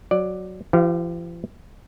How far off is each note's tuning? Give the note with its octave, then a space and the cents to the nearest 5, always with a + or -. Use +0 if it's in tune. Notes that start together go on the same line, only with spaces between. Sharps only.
F#3 +0 D5 +10
F3 -45 G4 -25 F5 +0